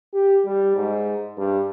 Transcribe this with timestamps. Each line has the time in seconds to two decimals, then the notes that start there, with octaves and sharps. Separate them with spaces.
0.13 G4
0.45 G3
0.76 G#2
1.38 G2